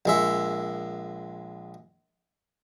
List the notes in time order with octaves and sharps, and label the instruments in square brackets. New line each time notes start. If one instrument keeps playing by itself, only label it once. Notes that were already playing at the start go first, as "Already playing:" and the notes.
[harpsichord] A#1 G#3 E5